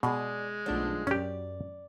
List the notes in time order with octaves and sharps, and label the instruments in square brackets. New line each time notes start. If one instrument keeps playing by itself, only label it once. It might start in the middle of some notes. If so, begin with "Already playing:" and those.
[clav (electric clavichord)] B2 [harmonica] G#3 [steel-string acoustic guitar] G#4 D5
[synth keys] B1 D4 G6 [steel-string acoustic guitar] D3 F3 A3
[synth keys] F#2 [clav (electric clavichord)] C#4 G4 [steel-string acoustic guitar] D5